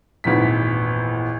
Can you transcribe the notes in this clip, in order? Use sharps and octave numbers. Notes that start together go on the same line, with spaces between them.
G#1 E2 A#2 B6